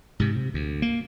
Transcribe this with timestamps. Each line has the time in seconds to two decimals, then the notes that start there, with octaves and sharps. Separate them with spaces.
0.20 G#2 C3
0.36 C3
0.54 D2
0.82 A#3